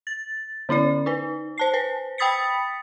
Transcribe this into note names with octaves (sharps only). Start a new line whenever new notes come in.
A6
D3 C#4 E4 D5
D#4 B4
C5 A5 C7
B4 C5
G5 B5 D#6 A6 B6 C#7